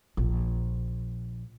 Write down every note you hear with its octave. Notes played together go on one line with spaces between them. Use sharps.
A#1